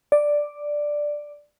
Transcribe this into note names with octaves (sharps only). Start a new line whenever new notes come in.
D5